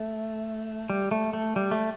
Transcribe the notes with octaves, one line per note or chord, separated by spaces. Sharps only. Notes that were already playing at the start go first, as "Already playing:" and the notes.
Already playing: A3
G3
A3
A3
G3
A3